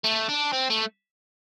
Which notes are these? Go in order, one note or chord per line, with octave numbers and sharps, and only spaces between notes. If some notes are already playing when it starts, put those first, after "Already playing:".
A3
D4
C4
A3